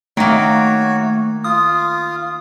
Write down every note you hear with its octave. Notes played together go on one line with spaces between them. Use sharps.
D#3 A3 A#3 F#4 C#5
F4 D#6